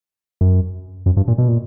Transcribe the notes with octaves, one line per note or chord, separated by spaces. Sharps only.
F#2
F#2
G2
A#2
B2
A#2